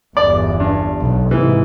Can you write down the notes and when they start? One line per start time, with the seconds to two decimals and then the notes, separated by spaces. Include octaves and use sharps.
0.17 G1 E2 D5
0.60 G2
1.01 B1
1.31 G#2 C3 E3